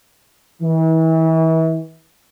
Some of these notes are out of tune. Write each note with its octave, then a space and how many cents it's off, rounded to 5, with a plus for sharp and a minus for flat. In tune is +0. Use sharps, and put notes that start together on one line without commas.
E3 -35